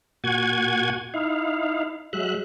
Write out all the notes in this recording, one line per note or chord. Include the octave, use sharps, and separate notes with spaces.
A#2 F#4 F#5 G#5 G#6
D#4 E4 F5
F#3 G#3 E5 F#6